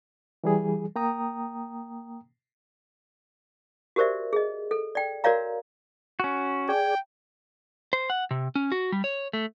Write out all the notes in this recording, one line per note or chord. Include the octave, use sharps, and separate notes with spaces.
E3 G3 G#4
A#3 G5 A#5 D#6
F#4 G4 A#4 C5 D5 E5
G#4 D#5
A4
D5 G5
F#4 A#4 C#5 D5 F5 A#5
C#4 F#4
G#4 D5 G5 G#5
C5
F#5
C3
C#4
F#4
G3
C#5
A3